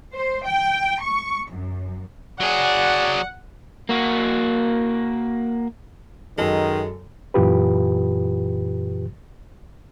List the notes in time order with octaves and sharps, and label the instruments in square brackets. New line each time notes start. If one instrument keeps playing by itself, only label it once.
[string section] C5
G5
C#6
F#2
[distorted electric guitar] F#3 G#4 [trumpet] D5 [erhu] F#5
[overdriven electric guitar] A#3 F#4
[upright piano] F#2 A4 [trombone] D#3 [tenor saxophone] G#3
[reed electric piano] F#2 A#2 E3 F4 G4 B4